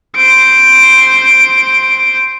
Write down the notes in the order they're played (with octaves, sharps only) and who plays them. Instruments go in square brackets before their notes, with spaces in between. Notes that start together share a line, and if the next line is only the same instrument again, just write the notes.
[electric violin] C5 D7